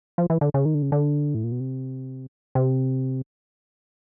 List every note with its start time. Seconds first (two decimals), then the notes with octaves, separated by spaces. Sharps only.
0.18 F3
0.30 E3
0.41 D3
0.54 C#3
0.65 D#3
0.74 D3
0.82 C#3
0.92 D3
1.35 A2
1.44 A#2
1.52 B2
1.60 C3
2.55 C3